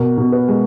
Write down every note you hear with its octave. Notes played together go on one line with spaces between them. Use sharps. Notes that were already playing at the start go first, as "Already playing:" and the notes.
Already playing: B2 A#4
B2
B4
G#3